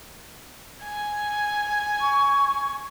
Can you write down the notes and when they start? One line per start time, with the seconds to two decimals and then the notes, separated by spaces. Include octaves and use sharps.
0.83 G#5
2.01 C#6